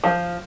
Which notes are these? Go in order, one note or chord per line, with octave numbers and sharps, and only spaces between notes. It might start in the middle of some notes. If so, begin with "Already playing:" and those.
F3